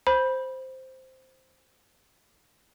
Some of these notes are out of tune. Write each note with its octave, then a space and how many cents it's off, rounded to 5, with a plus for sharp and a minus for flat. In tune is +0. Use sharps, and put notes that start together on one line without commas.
C5 +0 B5 -15